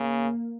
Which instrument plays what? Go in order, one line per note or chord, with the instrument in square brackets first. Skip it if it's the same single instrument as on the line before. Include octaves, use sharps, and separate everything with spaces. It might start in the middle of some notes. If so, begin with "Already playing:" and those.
Already playing: [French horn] C#3 [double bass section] A#3